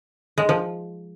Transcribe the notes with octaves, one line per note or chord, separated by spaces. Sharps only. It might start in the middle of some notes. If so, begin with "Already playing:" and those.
G#3
F3